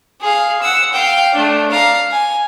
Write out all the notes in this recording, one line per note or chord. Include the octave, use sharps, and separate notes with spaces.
G#4 F5
F#5 E6
F5 G5
A3 D4
F5 A#5
G#5